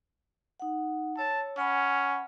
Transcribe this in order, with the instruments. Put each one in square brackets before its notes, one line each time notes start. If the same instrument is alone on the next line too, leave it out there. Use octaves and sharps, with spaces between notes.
[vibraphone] D#4 F#5
[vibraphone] C#5 E6 [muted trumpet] A5
[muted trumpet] C#4 [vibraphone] F#5 G#5 B5